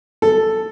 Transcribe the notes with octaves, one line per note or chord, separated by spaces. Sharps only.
A4